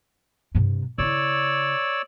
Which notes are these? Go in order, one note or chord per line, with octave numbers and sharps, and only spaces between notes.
G2 C3
C#3 E4 C#5 D5 E6